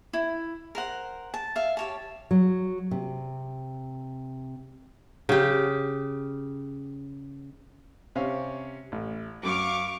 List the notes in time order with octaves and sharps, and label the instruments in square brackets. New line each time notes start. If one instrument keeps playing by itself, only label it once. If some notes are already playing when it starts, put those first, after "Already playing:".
[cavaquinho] E4
A#4 C5 F#5
A5
E5 F5
G4 C#5 A5
[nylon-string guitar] F#3
C3
[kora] C#3 G4
[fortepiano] C3 C#4 F5
A1
[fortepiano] F#2 F#3 [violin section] F5 C#6 D6